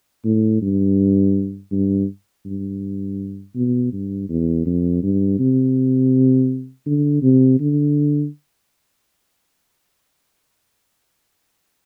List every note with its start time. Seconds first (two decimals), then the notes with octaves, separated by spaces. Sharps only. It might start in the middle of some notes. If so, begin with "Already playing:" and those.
0.25 A2
0.62 G2
1.72 G2
2.46 G2
3.56 B2
3.93 G2
4.29 E2
4.66 F2
5.03 G2
5.39 C3
6.86 D3
7.23 C3
7.60 D3